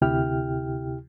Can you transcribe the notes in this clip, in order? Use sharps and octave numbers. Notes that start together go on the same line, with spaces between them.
D2 C3 E4 G4 G5 F6